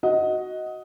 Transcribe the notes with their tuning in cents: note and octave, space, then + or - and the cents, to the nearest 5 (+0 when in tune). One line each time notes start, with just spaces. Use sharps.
F#4 +0 D#5 +10 F#5 +0